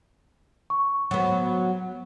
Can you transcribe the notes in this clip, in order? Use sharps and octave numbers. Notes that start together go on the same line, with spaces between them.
C#6
F#3 B3